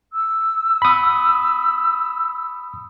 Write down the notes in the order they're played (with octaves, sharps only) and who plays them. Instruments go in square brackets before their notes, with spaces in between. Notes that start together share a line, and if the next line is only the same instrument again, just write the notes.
[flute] E6
[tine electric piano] B5 D#6